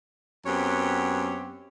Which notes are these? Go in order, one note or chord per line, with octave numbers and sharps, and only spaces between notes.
F#2 B3 C4 G4 C#5